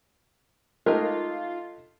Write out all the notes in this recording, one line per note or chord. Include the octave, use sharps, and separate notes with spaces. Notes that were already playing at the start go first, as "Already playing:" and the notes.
G#3 A3 D#4 F4 G4 A#4